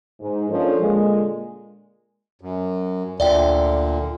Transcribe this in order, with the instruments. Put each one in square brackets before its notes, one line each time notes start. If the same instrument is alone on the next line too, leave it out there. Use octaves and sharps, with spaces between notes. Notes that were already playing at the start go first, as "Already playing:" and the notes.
[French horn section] G#2
F3 A#3 C#4 D4 A4
A#2 D3 G#3
[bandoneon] F#2
[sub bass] D2 [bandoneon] A#2 D3 [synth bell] D5 E5 G5